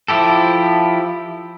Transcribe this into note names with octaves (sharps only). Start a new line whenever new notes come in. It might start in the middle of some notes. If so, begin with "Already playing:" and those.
F3 E4 G4 A4